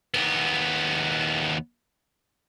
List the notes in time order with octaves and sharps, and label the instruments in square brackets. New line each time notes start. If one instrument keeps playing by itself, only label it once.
[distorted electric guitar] D#2 B3